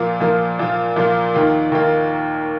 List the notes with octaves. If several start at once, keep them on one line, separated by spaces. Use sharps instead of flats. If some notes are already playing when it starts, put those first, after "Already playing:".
Already playing: A#2 F3 A#3 F4
A#2 F3 A#3 F4
A#2 F3 A#3 F4
A#2 F3 A#3 F4
D#2 D#3 A#3 F4
D#2 D#3 A#3 F4